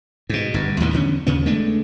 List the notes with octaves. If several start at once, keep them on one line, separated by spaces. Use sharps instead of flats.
G#2 B2
G1 G2
D#2 A2 C3 D#3
E2 D3 C#4
D#2 C#3 B3
G#3 A3 B3 D4